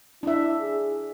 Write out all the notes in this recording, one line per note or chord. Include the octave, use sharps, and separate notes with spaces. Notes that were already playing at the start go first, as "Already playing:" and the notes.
D4 E4 E5
G#4